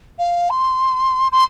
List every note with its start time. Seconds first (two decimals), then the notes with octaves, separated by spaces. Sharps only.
0.19 F5
0.50 C6
1.32 C6